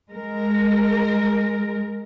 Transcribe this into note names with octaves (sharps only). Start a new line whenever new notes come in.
G#3 A#4